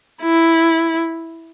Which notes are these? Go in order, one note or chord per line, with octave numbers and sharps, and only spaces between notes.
E4